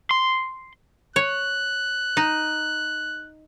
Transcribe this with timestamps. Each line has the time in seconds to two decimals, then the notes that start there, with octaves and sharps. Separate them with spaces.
0.11 C6
1.16 C#5 F#6
2.17 D#4